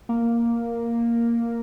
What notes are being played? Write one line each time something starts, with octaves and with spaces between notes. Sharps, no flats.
A#3